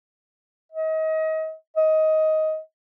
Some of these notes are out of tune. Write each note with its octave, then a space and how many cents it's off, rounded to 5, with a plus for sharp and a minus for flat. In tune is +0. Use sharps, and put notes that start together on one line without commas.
D#5 +30
D#5 +15